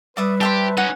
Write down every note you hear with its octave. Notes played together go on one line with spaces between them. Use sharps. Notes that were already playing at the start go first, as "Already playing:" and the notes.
G3 B4 D5 E5 D#6
G4 C5 E5 A5
C#4 D#4 F#5